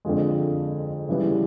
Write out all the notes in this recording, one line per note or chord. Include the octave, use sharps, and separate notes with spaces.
F2 D3 F3 G#3
C#3 E3 G3 B3